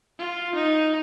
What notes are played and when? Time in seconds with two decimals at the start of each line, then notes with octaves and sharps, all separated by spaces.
0.18 F4
0.55 D#4